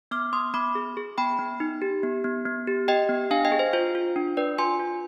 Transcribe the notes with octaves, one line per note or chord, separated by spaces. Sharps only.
B3 D6 F6
B3 C6 D#6
B3 B5 D6
G#4
G#4
B3 G5 B5
B3
D#4
G4
B3
B3
B3
G4
G4 D#5 G5
B3
D4 F5 G#5
D#5 G5
G#4
C5
F4 C5
F4
D4
D4 B4 D5
F4 G#5 C6
F4